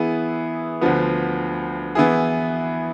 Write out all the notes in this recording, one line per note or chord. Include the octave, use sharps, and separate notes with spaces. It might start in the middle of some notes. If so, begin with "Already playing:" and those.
Already playing: E3 B3 E4 G#4
D2 D3 F3 B3
E3 B3 E4 G#4